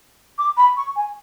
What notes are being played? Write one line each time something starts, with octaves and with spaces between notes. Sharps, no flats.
D6
B5
C#6
G#5